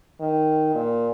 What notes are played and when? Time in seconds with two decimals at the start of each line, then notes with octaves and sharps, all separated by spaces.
0.20 D#3
0.75 A#2